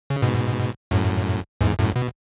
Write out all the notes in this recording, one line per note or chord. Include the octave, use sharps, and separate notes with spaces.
C#3
G#2 B2
F#2 A2
E2 G#2
F#2 A2
B2